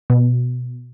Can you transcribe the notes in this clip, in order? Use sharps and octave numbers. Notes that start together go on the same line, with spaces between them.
B2